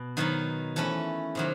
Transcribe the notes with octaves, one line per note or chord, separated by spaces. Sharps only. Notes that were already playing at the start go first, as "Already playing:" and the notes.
Already playing: B2
D#3 F#3 B3 D#4
E3 A3 C#4 E4
C3 D#3 F#3